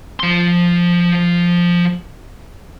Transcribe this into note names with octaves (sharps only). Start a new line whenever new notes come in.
F3 C6